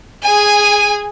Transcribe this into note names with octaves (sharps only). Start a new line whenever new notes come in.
G#4 G#5